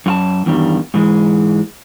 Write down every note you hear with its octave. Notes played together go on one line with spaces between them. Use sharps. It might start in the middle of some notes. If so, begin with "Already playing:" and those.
F#2 F4 A5
E2 G2 D#3 G3
G#2 E3 G#3